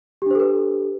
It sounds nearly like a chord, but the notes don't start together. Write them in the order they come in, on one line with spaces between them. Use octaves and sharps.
G4 D4 C5 A4 B4